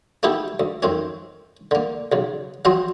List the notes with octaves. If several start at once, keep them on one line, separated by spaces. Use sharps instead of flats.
A3 B3 D#4 E4 G4 A4
D2
F2 D#3 C4 C#4
D3 A#3
B1 C#3
F3 F#3 C4 F#4 C5 D#5